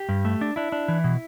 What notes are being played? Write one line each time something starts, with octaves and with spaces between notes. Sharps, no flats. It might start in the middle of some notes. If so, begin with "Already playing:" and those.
Already playing: G4
G2
A3
D4
D4 E4
D4
E3
B2